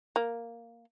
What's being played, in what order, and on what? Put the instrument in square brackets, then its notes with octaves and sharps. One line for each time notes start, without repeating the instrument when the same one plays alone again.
[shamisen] A#3